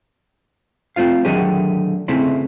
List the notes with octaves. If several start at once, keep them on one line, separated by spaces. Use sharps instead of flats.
A3 C4 F4 F5
D3 D#3 F#3 A3 G4 G#4
C#3 A3 C4 E4